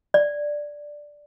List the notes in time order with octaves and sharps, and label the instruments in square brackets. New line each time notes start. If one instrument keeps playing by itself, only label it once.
[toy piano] D5